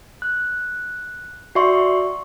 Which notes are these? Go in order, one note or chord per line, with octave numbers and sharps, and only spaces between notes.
F#6
F#4 D5 E5 C6 C#6